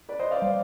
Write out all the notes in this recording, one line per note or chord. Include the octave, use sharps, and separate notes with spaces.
B4 D5
C5 D#5
D5 F5
G3